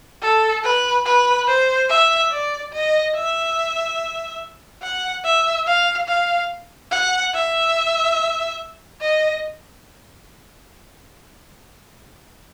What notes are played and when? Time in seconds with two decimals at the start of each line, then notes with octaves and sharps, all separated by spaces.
0.22 A4
0.64 B4
1.05 B4
1.47 C5
1.89 E5
2.31 D5
2.73 D#5
3.15 E5
4.82 F#5
5.24 E5
5.67 F5
6.08 F5
6.91 F#5
7.34 E5
9.01 D#5